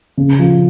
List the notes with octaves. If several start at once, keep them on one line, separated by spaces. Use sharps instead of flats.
C#3
F3